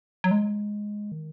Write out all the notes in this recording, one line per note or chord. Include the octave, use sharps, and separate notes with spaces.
F#3
G#3
D#3